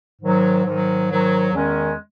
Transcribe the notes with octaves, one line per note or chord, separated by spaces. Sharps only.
G#2 D#3 F#3
G#2 D#3 F#3
G#2 D#3 F#3
E2 D#3 G#3 C#4